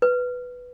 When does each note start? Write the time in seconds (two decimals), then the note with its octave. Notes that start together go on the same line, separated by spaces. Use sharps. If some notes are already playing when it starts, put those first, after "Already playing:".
0.02 B4